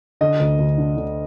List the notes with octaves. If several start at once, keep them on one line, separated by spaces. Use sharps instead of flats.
D3 D#5
D2
D2
D3
D3